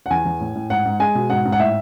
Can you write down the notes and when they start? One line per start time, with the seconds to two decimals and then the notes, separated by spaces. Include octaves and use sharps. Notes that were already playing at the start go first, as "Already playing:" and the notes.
0.06 F#5
0.10 E2 G#5
0.25 E2
0.40 A2
0.55 A2
0.70 G#2 F#5
0.85 G#2
1.00 G#3 G#5
1.15 B2
1.30 G#2 F#5
1.45 G#2
1.52 F#5
1.60 A2 E5